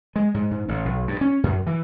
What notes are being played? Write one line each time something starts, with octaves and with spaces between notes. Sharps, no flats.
G#3
G#2
G#2
A1
B1
G2
C#4
F#2
E3